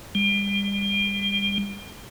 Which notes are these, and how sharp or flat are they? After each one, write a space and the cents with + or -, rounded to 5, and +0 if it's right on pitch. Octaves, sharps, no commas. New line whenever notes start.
G3 +35